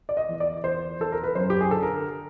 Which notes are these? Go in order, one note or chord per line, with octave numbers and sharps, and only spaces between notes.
D5
D#5
E2
D5
E2 C5
E2 A4
A#4
B4
F#2 C5
G4
G#4
D3 A4
A#4